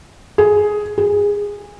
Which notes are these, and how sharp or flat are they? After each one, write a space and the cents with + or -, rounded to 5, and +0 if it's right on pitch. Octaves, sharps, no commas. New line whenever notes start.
G#4 +10
G#4 -20